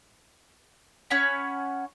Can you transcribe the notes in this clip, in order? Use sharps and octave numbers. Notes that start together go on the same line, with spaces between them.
C#4 C#5 F#5 B5